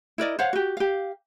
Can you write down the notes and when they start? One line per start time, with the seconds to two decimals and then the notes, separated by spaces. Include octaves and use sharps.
0.18 E4 A#4 D5 D#5
0.39 C5 C#5 F5 F#5
0.53 F#4 G4
0.77 G4 F5